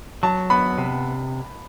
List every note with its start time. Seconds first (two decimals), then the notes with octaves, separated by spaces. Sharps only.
0.23 F#3 A5
0.50 B3 B5
0.78 C3